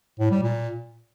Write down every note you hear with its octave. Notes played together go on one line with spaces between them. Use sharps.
A2
G3
A#2